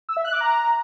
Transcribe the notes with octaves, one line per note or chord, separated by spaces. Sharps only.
E6
E5
F#6
D6
A#5